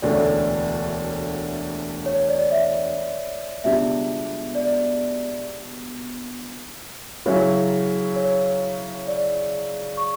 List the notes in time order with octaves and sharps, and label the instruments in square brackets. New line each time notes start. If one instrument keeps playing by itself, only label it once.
[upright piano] E1 D2 D3 A3 C#4 [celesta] D5
[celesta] C#5
D5
E5
[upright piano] C#2 B2 G3 D4 G4 [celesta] E5
[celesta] D5
[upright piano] C#3 F#3 C#4 E4 [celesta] C#5
[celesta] C#5
D5
C#6